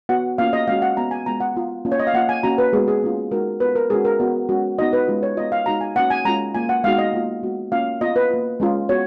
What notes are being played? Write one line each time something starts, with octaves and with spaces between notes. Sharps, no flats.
B3 F#4 F#5
A#3 C#4 F4 F5
D#5
G#3 C#4 F#4 F5
F#5
B3 F#4 A#5
G#5
G#3 B3 F4 A#5
F#5
B3 F4
A#3 C#4 F4
C#5
D#5
F5
A#3 F4 F#5
G#5
A#3 C#4 F#4 A#5
B4
G#3 B3 F#4 G#4
G#4
A#3 C#4 F4
G#3 D#4 F#4 A#4
B3 F4 B4
A#4
G#3 C#4 F#4 G#4
A#4
B3 F#4
G#3 C#4 F#4
B3 D#4 F#4 D#5
B4
G#3 C#4 F4
C#5
B3 F4 D#5
F5
G#3 D#4 F#4 A#5
G#5
A#3 C#4 F#4 F#5
G#5
G#3 C#4 F4 A#5
A#3 F4 G#5
F#5
G#3 B3 D#4 F#4 F5
D#5
A#3 F4
G#3 B3 F#4
A#3 C#4 F4 F5
B3 F4 D#5
B4
A#3 F4
G#3 C#4 F4
B3 F#4 C#5